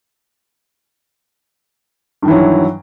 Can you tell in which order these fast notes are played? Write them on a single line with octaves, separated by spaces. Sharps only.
G2 D#3 E3 F#3